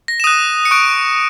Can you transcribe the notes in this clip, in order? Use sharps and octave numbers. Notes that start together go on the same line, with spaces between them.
A#6
E7
D#6 F#6 D#7
C#7
C#6 F#6 D7